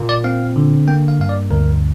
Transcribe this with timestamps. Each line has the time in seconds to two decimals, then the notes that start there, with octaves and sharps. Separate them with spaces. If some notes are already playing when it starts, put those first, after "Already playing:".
Already playing: A#2 A#3
0.09 D5
0.24 C4 F5
0.56 D3
0.87 A#3 G5
1.08 F5
1.19 G2 F5
1.29 D5
1.50 D2 A#4